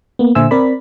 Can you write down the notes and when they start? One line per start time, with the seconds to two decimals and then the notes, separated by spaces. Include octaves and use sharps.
0.19 A#3 B3
0.35 A#2 D3 C5 E5 G#5 E6
0.51 C4 A#4 D5 B5